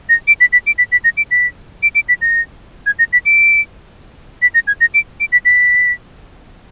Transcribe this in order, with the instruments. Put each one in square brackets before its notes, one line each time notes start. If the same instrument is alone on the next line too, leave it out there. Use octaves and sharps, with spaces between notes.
[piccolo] A#6
D7
B6
B6
D7
B6
B6
A#6
D7
B6
D7
D7
B6
A#6
G#6
A#6
B6
D7
B6
A#6
G#6
A#6
D7
D7
B6
B6